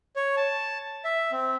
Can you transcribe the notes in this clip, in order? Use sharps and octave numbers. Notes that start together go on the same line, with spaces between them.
C#5
A5
E5
C4